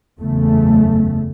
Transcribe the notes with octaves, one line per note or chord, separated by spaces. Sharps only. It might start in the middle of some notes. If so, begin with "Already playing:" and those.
F#1 E2 C#3 A3